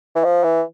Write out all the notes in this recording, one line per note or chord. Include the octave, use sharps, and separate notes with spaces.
E3
F3
E3